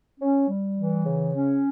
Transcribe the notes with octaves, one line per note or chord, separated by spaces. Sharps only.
C#4
G3
E3
C#3
C#4